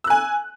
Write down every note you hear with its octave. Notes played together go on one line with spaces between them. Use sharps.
G#5 E6 F#6